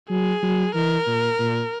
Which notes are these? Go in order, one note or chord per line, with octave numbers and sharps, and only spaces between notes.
F#3 G#4
F#3
E3 A#4
A#2
A#2